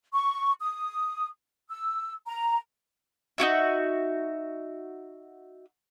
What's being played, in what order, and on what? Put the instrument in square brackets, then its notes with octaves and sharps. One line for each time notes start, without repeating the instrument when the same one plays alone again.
[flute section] C#6
D#6
E6
A#5
[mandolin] D#4 E4 F#4 E5